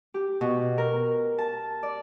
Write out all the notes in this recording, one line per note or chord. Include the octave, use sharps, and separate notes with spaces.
G4
B2
A#4
A5
D5